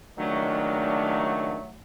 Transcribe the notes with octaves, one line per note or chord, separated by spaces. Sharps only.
C#2 D#3 F#3 A3 D4